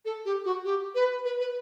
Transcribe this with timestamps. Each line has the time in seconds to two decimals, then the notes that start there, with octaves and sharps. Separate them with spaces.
0.05 A4
0.25 G4
0.45 F#4
0.65 G4
0.95 B4
1.25 B4
1.40 B4